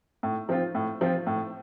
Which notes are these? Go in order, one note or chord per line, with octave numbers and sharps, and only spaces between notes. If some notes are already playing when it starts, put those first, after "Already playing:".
A2
F3 C4 F4
A2
F3 C4 F4
A2